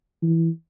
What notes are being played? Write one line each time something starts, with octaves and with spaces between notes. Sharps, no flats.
E3